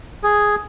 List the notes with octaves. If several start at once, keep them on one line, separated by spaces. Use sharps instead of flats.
G#4